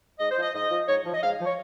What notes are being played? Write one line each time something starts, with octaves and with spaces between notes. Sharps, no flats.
G#2 D#5
C5
F3 D#5
G#2 D#5
F3
G#2 C#5
F3
D#5
G#2 F5
F3
C#5